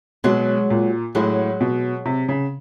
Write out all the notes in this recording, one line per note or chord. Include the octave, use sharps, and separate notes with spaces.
B2 F#3 G#3
A#2
A2 F#3 G#3
B2
C3
C#3